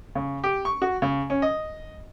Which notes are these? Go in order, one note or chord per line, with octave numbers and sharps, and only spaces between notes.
C#3
G4
C#6
F#4
C#3
C#4
D#5